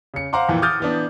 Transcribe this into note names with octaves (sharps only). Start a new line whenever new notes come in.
C#3 C#7
C5 F5 F#5 A#5 C6 D6
F2 A#2 E3
D6 D#6 F6 G6 A6
E3 B3 D4